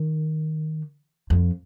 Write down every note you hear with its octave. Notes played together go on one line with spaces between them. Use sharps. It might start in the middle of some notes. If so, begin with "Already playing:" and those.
Already playing: D#3
F2